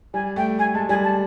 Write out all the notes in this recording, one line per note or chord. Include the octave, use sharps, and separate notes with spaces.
G3 G#5
A3 G5
A3 G#5
G#3 A5
G3 G#5
A5